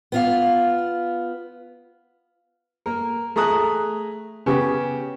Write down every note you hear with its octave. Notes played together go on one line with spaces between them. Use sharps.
B3 F4 F5
A#3 A#4
A3 G#4 A#5 D#6 F#6
C#3 B3 G4